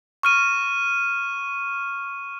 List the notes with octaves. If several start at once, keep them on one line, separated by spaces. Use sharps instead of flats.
C#6 F6 D#7